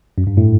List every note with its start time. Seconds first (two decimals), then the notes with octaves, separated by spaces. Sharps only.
0.18 F#2
0.27 G2
0.37 A2